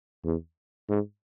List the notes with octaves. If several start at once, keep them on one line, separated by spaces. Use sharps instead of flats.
E2
G#2